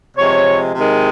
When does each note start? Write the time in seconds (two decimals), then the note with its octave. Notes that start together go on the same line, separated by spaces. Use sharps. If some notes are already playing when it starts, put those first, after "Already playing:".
0.17 C3 F3 G#3 C#5
0.75 C3 D#3 G#3